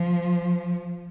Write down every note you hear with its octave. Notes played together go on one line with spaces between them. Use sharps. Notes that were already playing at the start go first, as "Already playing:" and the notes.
Already playing: F3